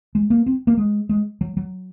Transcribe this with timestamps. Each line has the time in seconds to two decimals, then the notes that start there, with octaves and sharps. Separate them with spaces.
0.15 G#3
0.30 A#3
0.46 C4
0.67 A#3
0.77 G#3
1.09 G#3
1.41 F#3
1.57 F#3